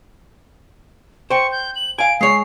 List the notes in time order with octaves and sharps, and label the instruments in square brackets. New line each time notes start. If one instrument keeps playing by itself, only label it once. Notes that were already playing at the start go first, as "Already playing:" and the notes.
[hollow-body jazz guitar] C5 G5 [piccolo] C#6
[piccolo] G6
F#7
[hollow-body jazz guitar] F5 G#5 [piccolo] D7
[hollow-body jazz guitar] G#3 C#5 [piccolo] C7